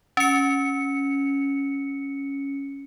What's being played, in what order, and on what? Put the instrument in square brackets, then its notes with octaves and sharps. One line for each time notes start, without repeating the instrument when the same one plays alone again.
[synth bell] C#4 C#7